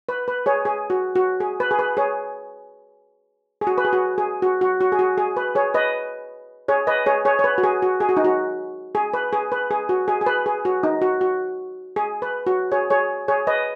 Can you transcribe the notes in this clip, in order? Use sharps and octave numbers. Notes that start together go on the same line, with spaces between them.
B4
B4
G#4 C#5
G#4
F#4
F#4
G#4
B4
G#4
B4
G#4 C#5
G#4
F#4
B4
G#4
F#4
G#4
F#4
F#4
F#4
G#4
F#4
G#4
B4
G#4 C#5
B4 D#5
G#4 C#5
B4 D#5
G#4 C#5
G#4 C#5
C#5
B4
F#4
G#4
F#4
G#4
F#4
D#4
F#4
G#4
B4
G#4
B4
G#4
F#4
G#4
G#4
B4
G#4
F#4
D#4
F#4
F#4
G#4
B4
F#4
G#4 C#5
G#4 C#5
G#4 C#5
B4 D#5